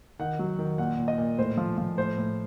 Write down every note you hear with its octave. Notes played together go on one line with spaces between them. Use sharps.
D#3 F#5
F#3
D#3
A#2 F#5
A#2
D#5
A#2
A2 C5
F3
F3
A2 C5
A2